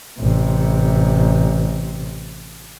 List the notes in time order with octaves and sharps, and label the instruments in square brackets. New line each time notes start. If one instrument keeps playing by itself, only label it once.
[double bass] A1 C3